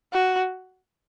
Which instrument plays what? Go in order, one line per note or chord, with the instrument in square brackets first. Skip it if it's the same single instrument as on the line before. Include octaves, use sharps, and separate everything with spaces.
[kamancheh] F#4